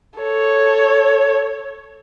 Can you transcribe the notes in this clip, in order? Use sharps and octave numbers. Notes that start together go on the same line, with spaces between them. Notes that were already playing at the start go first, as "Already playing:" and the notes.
A4 C#5